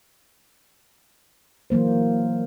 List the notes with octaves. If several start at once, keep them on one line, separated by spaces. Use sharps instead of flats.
E3 F#3 A#3 C5